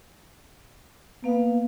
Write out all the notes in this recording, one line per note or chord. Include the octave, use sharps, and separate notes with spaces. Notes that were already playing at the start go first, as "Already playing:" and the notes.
A#3 B3 F5